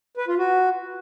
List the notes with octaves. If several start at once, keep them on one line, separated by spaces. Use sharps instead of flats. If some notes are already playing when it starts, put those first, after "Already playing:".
B4
F4
F#4